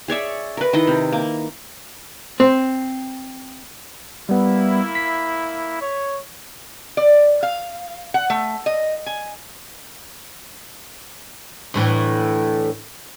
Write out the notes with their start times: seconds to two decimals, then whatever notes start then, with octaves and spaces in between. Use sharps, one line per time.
0.08 G#4 C#5 D5 E5
0.57 A#4 B4
0.73 D#3 E4 D#5
0.87 C3
1.13 A#3
2.40 C4
4.29 G3 A#3 B3 E4
4.95 B6
5.80 C#5
6.97 D5
7.43 F5
8.14 F#5
8.30 A3
8.66 D#5
9.06 G#5
11.74 D2 A2 E3